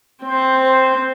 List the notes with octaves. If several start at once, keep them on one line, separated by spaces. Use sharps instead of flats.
C4 C5
C5